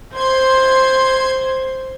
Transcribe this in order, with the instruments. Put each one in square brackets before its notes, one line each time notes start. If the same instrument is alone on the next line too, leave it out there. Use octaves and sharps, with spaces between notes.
[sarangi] C5 [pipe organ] C6 G#6